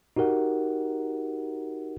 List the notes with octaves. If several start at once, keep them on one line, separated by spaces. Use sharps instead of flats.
D#4 F#4 G4 A#4 F#5